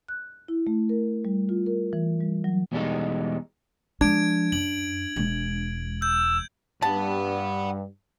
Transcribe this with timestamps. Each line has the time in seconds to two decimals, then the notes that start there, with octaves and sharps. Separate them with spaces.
0.08 F#6
0.48 E4
0.67 A3
0.89 A#4
1.25 G3
1.49 F4
1.67 A#4
1.93 E3
2.20 G3
2.44 F#3
2.72 E2 B2 G3 G#3 D#4 A4
4.01 F3 G#3 D4 G#6 D7
4.52 F#2 F#7
5.16 E1 G#3
6.02 E6 G6
6.82 G2 F#5 A5 B5